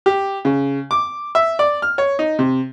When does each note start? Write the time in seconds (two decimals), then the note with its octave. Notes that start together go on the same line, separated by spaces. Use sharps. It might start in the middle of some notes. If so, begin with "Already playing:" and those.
0.06 G4
0.45 C#3
0.91 D6
1.35 E5
1.59 D5
1.82 F6
1.98 C#5
2.19 D#4
2.39 C3